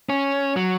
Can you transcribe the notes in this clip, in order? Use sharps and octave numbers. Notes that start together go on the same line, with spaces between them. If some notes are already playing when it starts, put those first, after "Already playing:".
C#4
F#3